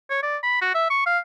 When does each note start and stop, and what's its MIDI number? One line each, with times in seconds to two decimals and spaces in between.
0.10 0.19 73
0.23 0.37 74
0.43 0.61 83
0.61 0.72 66
0.74 0.88 76
0.90 1.03 85
1.06 1.18 77